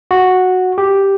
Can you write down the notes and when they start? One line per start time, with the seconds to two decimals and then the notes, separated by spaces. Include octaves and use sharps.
0.11 F#4
0.78 G4